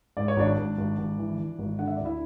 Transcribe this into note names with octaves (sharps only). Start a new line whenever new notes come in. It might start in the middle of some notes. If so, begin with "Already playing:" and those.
G#2 D5
C#5
G#1 D4 D5
G#1
G#1
G#1
E3
E3
G#1
D3 F#5
E5
D2 D5
E4 E5